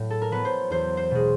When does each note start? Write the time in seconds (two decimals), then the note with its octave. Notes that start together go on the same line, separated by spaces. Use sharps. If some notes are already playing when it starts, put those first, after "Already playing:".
Already playing: A2 F#3
0.10 A4
0.22 A#4
0.31 F#3 B3 B4
0.45 C5
0.70 E2 C5
0.97 C5
1.11 B2 G#3